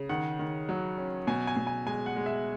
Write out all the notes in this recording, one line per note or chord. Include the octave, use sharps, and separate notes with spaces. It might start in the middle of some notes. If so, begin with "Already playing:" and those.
Already playing: C#3
D#3 F#5
D#3
F#3
C#4
B2 G#5
G#5
B2
G#5
G#3 G#5
F#5
G#3
E5